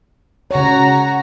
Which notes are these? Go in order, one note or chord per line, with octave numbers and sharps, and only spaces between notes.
C#3 F#4 C#5 A#5